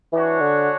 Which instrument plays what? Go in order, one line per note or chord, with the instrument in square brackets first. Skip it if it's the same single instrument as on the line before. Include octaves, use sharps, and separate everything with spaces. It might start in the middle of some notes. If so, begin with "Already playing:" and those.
[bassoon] E3 [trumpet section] G#3 D4 F#4 C#5
[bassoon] D3